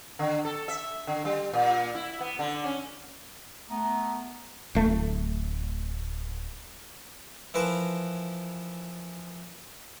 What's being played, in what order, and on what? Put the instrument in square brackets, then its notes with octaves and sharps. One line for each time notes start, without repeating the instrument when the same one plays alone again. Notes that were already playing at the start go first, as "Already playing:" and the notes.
[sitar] D3
A4
E5
D3
G3
A#2
E4
B3
D3
C#4
[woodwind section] A3 B3 [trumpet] A#5
[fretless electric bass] D1 A3
[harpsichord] E3 F3 A#4 B4